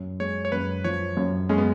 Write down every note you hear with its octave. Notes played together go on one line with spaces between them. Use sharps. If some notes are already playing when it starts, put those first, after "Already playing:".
Already playing: F#2
G#3 C#5
C#5
F#2 B4
F3 C#5
F#2
G#3 C#4
B3